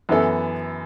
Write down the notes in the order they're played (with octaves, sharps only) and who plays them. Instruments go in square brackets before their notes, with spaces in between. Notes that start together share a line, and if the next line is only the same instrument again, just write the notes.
[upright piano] F#2 E3 B3 E4 A4